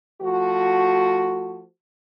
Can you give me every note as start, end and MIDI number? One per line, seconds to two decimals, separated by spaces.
0.22 1.64 53
0.22 1.64 57
0.22 1.64 66